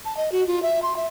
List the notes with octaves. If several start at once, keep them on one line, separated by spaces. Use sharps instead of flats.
A5
D#5
F#4
F4
E5
C6
E5